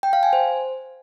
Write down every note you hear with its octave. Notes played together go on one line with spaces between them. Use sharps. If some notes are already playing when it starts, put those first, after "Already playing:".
G5
F5
G#5
C5